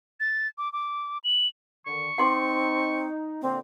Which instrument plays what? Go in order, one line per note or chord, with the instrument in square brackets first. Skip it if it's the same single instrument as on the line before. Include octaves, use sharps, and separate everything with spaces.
[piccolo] A6
D6
D6
F#7
[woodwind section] D3 D#3 [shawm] C#6
[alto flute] C4 [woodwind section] D#4 [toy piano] F#5 C6 D6
[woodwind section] A#2 D3 A#3 [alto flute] C4